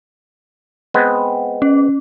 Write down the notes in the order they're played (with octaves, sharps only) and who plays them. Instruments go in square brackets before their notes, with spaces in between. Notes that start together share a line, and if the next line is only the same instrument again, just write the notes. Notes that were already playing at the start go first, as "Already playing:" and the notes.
[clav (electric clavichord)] G#3 B3 C4
[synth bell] C#4